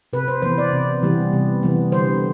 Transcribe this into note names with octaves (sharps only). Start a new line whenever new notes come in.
C3 B4
C5
E3 B3 C5
D5
C3
E3 G3 B3
C3
E3 G3 B3
D3 C5